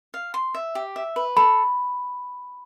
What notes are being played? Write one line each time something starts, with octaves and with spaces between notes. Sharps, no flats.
F5
C6
E5
G4
E5
B4
A4 B5